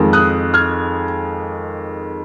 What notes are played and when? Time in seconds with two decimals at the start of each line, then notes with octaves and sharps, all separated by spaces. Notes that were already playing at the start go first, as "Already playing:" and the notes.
Already playing: F2 D#3 G#3
0.13 D#6 F#6
0.54 F6 G#6